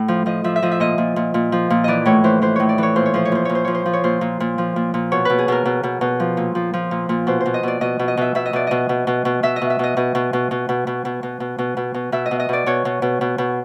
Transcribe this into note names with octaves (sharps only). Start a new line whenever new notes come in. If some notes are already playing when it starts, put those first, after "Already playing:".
Already playing: A2
F3
F3 D#5
F3 E5
E5
F3 D#5
E5
A#2 D#5
A#2
A#2
A#2
F3
A#2
E3 D5 D#5
A2 C#5
E3 C5
E3 C5
A2 C#5
D5
E3 C#5
A#2 C5
C#5
F3 C5
C#5
A#2 C5
A#2 C#5
C5
F3 C#5
C5
F3
C#5
A#2 C5
A#2
A#2
F3
A#2
A#2
B2 C#5
B2 B4
G#4
B2 A#4
B2
B2
B2
F3
A#2
F3
F3
A#2
A#2
B2 C5
C5
B2
D#5
B2 D5
B2 D#5
B2
D#5
B2 E5
B2 E5
D#5
B2 D5
B2 D#5
B2
B2
B2
B2 E5
D#5
B2
E5
B2 D#5
B2 D#5
B2
B2
B2
B2
B2
B2
B2
B2
B2
B2
B2
B2 E5
D#5
B2
D#5
B2 D5
B2 C#5
B2
B2
B2
B2